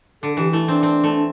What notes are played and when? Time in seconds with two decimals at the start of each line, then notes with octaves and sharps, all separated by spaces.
0.22 D3 A4
0.37 E3 G4
0.52 A3 E4
0.68 C4 D4
0.83 C4
1.03 A3